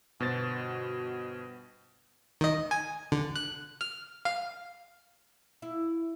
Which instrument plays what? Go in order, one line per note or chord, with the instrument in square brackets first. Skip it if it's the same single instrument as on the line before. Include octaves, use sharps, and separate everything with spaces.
[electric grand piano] G1 B2 F#4 B4 C5 A6
[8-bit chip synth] D#3 D#5
G#5
D3
F#6
F6
F5
[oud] E4